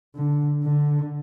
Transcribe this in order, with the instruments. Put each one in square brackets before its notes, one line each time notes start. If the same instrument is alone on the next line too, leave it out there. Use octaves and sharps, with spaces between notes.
[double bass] D3
D3